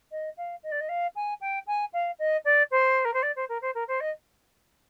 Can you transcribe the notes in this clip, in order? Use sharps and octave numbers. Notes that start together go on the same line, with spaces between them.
D#5
F5
D#5
D5
D#5
F5
G#5
G5
G#5
F5
D#5
D5
C5
A#4
C5
D5
C5
A#4
C5
A#4
C5
D#5